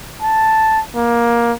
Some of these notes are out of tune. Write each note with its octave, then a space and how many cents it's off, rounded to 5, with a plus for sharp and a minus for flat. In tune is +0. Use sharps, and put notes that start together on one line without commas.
A5 +0
A#3 +15